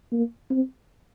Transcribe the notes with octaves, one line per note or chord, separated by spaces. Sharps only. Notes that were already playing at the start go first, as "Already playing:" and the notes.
A#3
C4